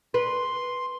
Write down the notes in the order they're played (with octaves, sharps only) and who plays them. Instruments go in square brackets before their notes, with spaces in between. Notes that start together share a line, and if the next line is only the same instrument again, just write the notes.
[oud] B4 [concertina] C6